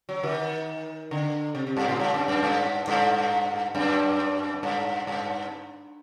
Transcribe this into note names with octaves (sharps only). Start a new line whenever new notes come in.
F#3
D#3
D3
C3
C3
G2
A2
G2
F#2
F#2
G2
G2
F#2
G2
G2